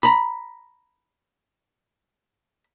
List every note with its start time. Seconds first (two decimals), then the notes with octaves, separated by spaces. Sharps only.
0.03 A#5 B5